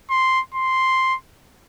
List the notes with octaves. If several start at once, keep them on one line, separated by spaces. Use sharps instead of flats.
C6
C6